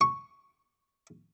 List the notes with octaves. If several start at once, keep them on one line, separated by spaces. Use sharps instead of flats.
C#6